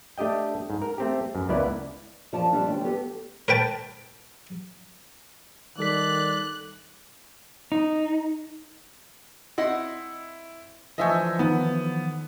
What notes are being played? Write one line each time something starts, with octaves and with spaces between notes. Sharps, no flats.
A3 D4 G4 D#5 G5
G#2
A#4
A3 C4 G4
F#2
C#2 A#3 B3 E4 D5
F#2 F3 F4 C5 D5 A5
F2 C3 G3 D4
D2 F#3 E5 G5
B3 G4 A4
A#4 B4 G5 A5
D#3 G3 A4 D5 F#6 B6
D#4
C4 E4 D#5 F#5
D3 E3 F3 A3 D#5 E5 G#5 G6
D#3 B3